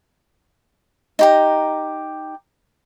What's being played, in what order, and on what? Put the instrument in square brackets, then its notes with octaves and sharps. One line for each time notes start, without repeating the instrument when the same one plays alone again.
[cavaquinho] D#4 G4 A#5